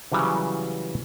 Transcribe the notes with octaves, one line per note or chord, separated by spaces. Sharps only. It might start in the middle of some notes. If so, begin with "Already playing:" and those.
C#3 E3 F#3 G3